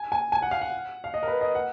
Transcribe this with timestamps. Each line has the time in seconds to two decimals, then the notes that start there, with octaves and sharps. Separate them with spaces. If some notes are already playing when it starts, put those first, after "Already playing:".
Already playing: G#5
0.12 G#5
0.32 G#5
0.42 F#5
0.51 F5
0.62 F#5
1.04 F5
1.14 D#5
1.23 A#4
1.28 B4
1.41 D#5
1.55 F#5